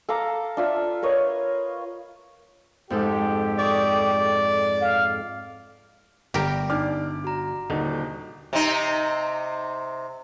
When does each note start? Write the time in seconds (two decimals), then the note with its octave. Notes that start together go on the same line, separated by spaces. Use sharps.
0.09 A4 F5 A#5 D6
0.57 D4 F4 E5
1.02 A#4 B4 C#5 D#5
2.90 F2 G#2 G4 A4
3.59 D5 C#6 D#6
4.81 F5
6.34 G1 G3 G4 A#4 G5
6.70 D4 D#4 D5 D6 F6 G6
7.24 F#4 A#5
7.70 D#1 D3 D#4
8.53 C3 D#4